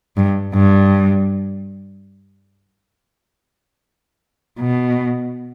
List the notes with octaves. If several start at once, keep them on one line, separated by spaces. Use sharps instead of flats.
G2
G2
B2